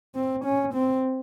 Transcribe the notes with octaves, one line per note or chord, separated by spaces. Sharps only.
C4
C#4
C4